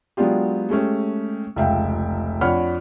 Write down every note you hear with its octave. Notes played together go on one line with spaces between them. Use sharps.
F#3 G#3 B3 D4 F4 G4
G#3 A3 C#4 G4
F1 C#2 E5 F5 G5
F2 D4 C#5 F#5 B5 F6